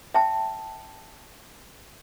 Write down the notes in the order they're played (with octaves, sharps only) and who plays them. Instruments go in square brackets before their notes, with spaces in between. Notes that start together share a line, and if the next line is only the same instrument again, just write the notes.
[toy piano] E5 G5 A5